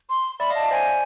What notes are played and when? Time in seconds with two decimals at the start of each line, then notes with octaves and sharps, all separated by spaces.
0.09 C6
0.39 D5 E5 B5
0.50 D#5 F5
0.56 A5
0.61 D5 E5
0.71 C5 D5 G#5